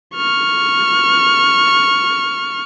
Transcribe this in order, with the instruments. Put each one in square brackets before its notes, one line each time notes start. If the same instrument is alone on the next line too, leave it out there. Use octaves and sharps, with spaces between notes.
[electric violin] C#6 F6